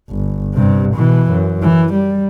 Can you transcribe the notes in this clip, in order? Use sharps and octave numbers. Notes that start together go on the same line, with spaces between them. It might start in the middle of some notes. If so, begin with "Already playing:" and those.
G1
G2 C3
B2 E3
F#2
E3
G3